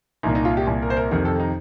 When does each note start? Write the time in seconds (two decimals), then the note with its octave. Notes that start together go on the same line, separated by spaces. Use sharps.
0.23 C2 A#2 D#4
0.35 D#4
0.45 F4
0.57 G4
0.67 C2 A#2
0.82 A#4
0.90 C5
0.97 A#4
1.11 F2 C3 D#3 A#4
1.25 A4
1.40 D#4